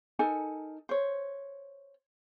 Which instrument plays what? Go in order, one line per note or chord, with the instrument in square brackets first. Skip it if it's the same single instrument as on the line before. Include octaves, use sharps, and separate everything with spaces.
[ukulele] D#4 A4 A#4 G#5
C5 C#5